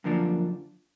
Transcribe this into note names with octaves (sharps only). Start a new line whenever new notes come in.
F#2 D3 F3 A#3 D4